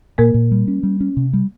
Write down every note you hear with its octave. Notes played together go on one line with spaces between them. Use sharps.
A#2 A#3 A#4
A#2
G3
C#4
G3
C#4
C3
G3